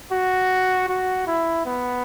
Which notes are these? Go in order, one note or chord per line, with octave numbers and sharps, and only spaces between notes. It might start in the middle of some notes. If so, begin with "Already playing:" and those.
F#4
F#4
E4
B3